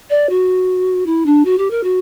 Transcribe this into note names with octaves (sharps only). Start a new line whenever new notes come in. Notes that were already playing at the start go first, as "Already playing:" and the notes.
D5
F#4
E4
D4
F#4
G4
A#4
F#4